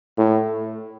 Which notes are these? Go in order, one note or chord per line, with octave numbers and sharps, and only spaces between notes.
A2